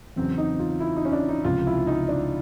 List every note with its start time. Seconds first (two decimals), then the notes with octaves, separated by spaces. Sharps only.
0.16 E2 C#3 F#3 C4
0.38 D#4
0.59 F4
0.80 E4
0.96 D#4
1.05 C#4
1.13 D4
1.29 D#4
1.44 C#2 C3 F3 F4
1.67 E4
1.87 D#4
2.09 D4